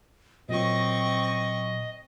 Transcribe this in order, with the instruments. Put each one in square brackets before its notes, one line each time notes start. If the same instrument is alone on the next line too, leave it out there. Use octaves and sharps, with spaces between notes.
[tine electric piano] A#2 F#3 [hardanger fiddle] C4 C#6 [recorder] D#5